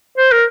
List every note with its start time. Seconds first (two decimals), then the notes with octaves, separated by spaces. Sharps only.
0.18 C5
0.31 A#4